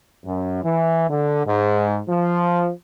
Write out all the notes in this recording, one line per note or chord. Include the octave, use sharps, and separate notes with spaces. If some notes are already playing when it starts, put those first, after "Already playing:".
F#2
E3
D3
G#2
F3